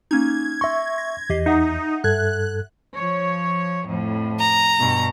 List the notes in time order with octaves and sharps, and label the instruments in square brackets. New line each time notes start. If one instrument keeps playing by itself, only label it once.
[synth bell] A#3 C#4 D#4 [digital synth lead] G#6
[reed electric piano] E5 C#6 [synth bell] C6 A#6
[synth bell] A#6
[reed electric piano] E2 [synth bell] G4 D#5 C7
[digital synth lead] D#4 [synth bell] E5 F#5
[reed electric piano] G2 A4 G#6 [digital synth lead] F#6
[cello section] F3 C#5
F2 A2
[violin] A#5
[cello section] G2 B2